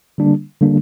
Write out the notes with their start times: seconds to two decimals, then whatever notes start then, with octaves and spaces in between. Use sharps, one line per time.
0.18 D3 G3 A#3 D4
0.61 D3 G3 A#3 D4